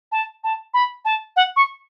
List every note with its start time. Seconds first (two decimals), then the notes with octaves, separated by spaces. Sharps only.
0.12 A5
0.44 A5
0.74 B5
1.05 A5
1.36 F#5
1.56 C#6